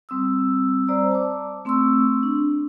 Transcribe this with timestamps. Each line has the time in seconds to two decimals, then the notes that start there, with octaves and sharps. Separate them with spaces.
0.09 G3 C4 D#6 E6
0.87 G3 C5 D5 A#5 D#6 E6
1.11 A5 D6
1.65 A3 C4 C6 C#6 E6
2.23 D4